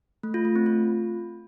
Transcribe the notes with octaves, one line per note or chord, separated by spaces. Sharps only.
A3
F4
A3
C4
F4